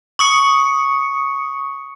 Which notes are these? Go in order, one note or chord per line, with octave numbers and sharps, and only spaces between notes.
C#6 D#6 C#7